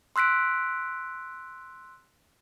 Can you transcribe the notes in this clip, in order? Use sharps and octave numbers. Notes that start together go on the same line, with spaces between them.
C6 E6 F#6 B6 D7